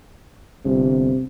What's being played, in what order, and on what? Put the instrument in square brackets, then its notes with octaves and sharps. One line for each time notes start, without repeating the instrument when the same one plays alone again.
[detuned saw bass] G1 [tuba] C3